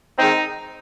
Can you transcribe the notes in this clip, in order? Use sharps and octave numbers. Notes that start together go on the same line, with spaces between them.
D#3 G#3 C4 D#4